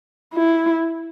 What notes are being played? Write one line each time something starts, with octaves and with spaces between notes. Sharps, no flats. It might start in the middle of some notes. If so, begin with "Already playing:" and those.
E4